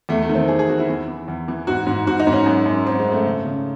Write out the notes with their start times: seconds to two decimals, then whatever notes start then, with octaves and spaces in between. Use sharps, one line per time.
0.09 E2 A3
0.23 A3
0.29 D#3
0.35 C4
0.48 E2 G#4
0.59 G#4
0.69 E2 F#4
0.79 E4
0.88 E2
1.08 E3
1.28 E2
1.48 E3
1.67 G#2 F#4
1.87 G#2
2.07 G#2 F#4
2.20 D#4
2.27 G#2
2.33 C#4
2.46 F#2
2.66 F#2
2.86 F#2 C4
2.99 G#3
3.06 F#2
3.12 A3
3.25 C#3
3.45 C#3